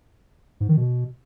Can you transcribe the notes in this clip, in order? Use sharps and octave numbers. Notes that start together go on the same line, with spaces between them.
G#2
D#3
B2